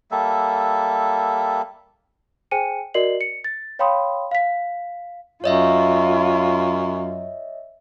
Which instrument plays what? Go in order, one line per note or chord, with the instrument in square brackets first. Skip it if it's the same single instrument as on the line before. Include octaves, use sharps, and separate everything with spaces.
[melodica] G3 A#3 A4 E5
[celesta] G#4 C5 G5 G#5 C#7 D#7
F#4 A#4 D5 D#5 C7 F#7
C#7
A6
C#5 F5 G5 B5 C6 D#6
F5 B6
[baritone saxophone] F#2 [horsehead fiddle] F4 [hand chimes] C#5 D#5 E5